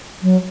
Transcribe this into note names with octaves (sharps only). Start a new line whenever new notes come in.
F#3